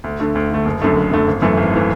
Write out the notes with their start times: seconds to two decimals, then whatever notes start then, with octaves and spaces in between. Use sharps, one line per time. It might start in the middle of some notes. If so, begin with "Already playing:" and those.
0.04 D2
0.20 D3 A3
0.35 D2
0.51 D3 A3
0.65 F#1
0.82 F#2 D3 A3
0.96 F#1
1.11 F#2 D3 A3
1.27 G#1
1.42 F#2 E3 A3
1.57 G#1
1.73 E3 A3